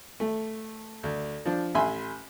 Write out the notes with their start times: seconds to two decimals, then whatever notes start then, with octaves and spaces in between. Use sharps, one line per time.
0.20 A3
1.03 D2
1.46 F3 D4
1.75 A1 E5 G#5 B5 C6